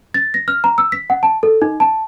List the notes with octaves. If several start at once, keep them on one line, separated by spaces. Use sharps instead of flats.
A6
A#6
F6
A#5
E6
B6
F#5
A5
A4
D#4
A5